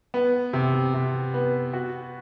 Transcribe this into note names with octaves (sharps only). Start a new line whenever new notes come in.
B3
C3
C3
B3
F#4